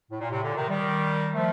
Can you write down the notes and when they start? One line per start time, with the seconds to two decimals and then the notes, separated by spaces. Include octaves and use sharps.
0.11 A2
0.20 A#2
0.30 A2 C3
0.43 A#2 D3
0.56 C3 D#3
0.69 D#3 G3
1.33 F3 A3